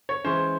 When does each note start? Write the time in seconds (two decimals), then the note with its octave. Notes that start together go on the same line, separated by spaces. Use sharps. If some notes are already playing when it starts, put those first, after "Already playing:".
0.09 C#5
0.24 E3 G#3 C#4 C5